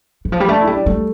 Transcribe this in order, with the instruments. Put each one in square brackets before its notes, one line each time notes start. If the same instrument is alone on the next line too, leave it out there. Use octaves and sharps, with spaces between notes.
[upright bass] E3
F3
G3
[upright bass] A3 [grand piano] D4
[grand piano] E4
[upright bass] G3
[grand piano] D4
[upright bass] G3 [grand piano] A3